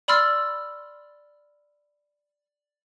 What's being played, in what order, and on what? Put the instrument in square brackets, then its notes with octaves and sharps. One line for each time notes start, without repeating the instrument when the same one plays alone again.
[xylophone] D5 B5 C6 E6 F6 A6